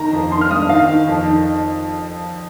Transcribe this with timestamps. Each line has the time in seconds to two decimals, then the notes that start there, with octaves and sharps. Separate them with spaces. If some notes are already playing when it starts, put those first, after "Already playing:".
Already playing: D#3 A#5
0.13 F2
0.32 D#3 C6
0.41 F6
0.50 G2 D#6
0.69 D#3 F5
0.88 D#3
1.07 F2
1.26 D#3